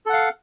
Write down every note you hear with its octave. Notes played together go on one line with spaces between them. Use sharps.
A4 F5 F#5